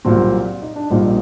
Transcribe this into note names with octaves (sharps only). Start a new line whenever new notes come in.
C2 A#2 F#3 C4
D#4
D4
A#1 A#2 G3 D#4